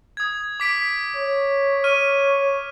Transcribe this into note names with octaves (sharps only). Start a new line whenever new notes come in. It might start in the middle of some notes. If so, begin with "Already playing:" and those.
D#6 G#6
D6 B6 D7
C#5
C#5 F6 D#7